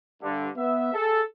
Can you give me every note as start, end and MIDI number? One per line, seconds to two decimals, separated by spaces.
0.23 0.50 43
0.23 0.50 50
0.57 0.94 59
0.57 0.94 76
0.94 1.23 68
0.94 1.23 69